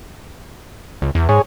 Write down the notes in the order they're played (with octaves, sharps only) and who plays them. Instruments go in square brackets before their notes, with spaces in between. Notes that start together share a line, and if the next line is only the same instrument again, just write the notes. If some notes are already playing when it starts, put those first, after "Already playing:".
[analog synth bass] C#2
E2
[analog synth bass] G#2 [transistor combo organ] G#4 C#5